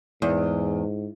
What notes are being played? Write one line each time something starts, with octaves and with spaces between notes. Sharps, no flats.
E2 G#2